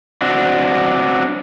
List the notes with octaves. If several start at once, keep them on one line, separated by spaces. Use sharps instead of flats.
C4 D4 F#4